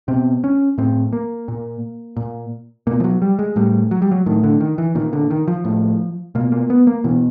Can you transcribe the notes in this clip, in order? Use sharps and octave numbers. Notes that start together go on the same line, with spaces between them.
B2 C4
C#4
A2 C4
A#3
A#2
A#2
B2 A#3
F3
F#3
G3
G#3
A2 G3
F#3
G3
F#3
A2 D#3
D3
D#3
E3
A#2 D#3
D3
D#3
F3
A2
B2 A#3
A#3
B3
A#3
B2 E3